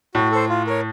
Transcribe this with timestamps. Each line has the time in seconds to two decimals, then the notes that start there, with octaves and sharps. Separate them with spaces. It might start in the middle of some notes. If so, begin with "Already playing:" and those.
0.14 A2 F#4
0.31 A4 C5
0.49 F4
0.67 A#4 C#5